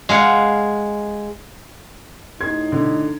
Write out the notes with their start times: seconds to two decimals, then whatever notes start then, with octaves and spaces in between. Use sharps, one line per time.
0.09 G#3 F5 F#5
2.40 A2 D#4 C6 G#6
2.72 D3